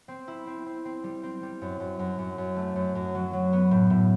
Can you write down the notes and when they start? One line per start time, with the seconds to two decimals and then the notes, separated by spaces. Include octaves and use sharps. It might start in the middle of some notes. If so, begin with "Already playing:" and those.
0.08 C4
0.28 E4
0.47 C4
0.66 C4
0.85 C4
1.04 G3
1.23 C4
1.43 G3
1.62 F#2
1.80 F#2
1.99 F#2
2.19 F#2
2.38 F#2
2.56 A3
2.76 F#2
2.95 F#2
3.15 F#3
3.33 F#3
3.53 B3
3.71 A2
3.90 A2